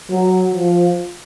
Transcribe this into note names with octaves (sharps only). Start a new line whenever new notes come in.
F#3
F3